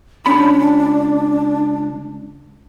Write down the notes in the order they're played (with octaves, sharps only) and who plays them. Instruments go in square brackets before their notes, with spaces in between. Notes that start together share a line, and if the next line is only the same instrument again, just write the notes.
[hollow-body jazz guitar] C#2 C#4 B5 [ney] D4